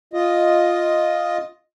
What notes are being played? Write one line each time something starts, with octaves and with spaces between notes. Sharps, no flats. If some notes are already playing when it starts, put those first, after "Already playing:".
F4 D#5